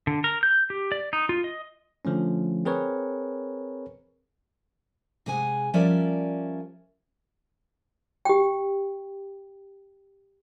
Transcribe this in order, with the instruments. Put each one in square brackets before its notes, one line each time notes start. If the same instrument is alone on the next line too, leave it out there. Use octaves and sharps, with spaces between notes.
[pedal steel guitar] D3
A#4
G6
G4
D5
D#4
F4
D#5
[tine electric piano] D3 F3 A3 C#4
C4 G#4 A#4 B4 C#5
[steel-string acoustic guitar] C3 G#3 G#4 F#5 G#5
F3 G3 C#4 A#4 D5 E5
[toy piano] G4 G5